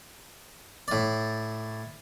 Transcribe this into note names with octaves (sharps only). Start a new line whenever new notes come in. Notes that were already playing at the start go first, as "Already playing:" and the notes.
A2 D5